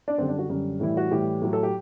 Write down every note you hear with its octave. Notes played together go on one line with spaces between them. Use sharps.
D4
F#2 D3 G3 C4
D4
F#4
F#2 D3 G3
A2 E3 G3 E4
F#4
A2 E3 G3 G4
A2 F#3
A4
G4